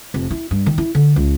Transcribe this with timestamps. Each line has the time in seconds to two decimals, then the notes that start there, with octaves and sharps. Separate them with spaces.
0.14 F1
0.31 E4
0.51 G2
0.66 D#3
0.78 E4
0.95 D3
1.16 C#2